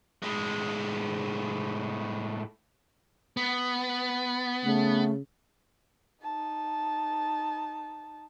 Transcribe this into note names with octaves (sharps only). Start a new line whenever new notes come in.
A2 G#3
B3
C#3 A3
D#4 A5